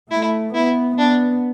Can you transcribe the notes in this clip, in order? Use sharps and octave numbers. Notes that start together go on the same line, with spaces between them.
A3 E4
B3 E4
B3 D4